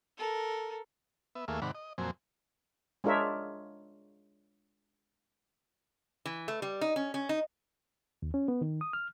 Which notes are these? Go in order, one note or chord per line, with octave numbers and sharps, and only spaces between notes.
A4 A#4
B3 E5
D#2 A3 A#3 G#4 E5 F5
G#2 C3 D#3 D5 F#5 B5
D#5
F2 A#2 F#3 C4 G#5
G#3 D4 F4 A#4 C#5 E5
E3
A3
G3
D#4
C#4
C#4
D#4
D#2
C#4
B3
D#3
D#6
F6